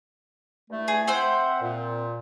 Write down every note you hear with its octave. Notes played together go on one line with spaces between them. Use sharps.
G2 E3 A3
G#4
C4 C5 E5 F#5
A#2